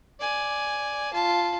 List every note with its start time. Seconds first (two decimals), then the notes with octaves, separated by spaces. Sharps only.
0.20 D5 G#5
1.13 F4 A5